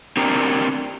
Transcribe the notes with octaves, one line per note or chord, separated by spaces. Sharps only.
C4 D4 G4 A#4